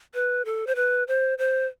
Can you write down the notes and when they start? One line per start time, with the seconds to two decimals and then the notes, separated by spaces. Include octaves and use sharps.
0.14 B4
0.45 A4
0.67 C5
0.76 B4
1.08 C5
1.38 C5